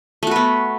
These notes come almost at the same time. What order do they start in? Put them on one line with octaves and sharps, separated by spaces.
A3 F#4 B4 B3